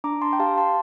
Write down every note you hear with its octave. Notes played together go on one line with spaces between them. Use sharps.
D4 A#5 D6
A5 C6
G5
G4 F5 A5
A5 C6